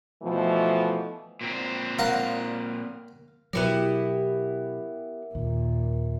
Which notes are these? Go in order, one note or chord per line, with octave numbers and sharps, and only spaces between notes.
B2 E3 F3 A3
A#2 C4
A#4 F5 F#5
B2 F#3 B3 E4 G4 A#4 C#5 E5
D#2 A#2